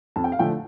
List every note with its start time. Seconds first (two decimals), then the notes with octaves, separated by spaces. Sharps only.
0.16 F2 A5
0.24 G5
0.32 F5
0.39 D3 F3 A3 G5